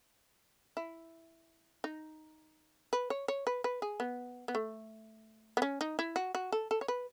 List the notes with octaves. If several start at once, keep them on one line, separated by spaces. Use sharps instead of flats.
E4
D#4
B4
C#5
C#5
B4
B4
G#4
B3
B3
A3
B3
C#4
D#4
E4
F#4
F#4
A4
A4
C#5
B4